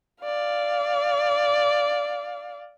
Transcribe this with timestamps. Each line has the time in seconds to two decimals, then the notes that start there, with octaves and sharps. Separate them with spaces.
0.24 D5 F5